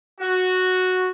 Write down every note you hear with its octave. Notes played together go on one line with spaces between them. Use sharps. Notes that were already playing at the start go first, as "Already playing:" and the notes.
F#4